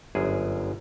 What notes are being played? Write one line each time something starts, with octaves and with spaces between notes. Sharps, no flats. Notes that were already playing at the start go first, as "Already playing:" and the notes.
G1 F#2 G#4